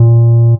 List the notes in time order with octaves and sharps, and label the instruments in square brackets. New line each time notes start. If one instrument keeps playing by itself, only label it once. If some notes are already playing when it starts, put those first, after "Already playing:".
Already playing: [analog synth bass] A#2